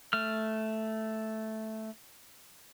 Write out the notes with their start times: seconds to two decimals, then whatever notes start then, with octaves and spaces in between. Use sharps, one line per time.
0.13 A3 F6